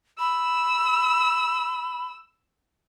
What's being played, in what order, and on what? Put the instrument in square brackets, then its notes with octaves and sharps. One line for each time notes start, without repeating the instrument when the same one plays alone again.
[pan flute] B5 [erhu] E6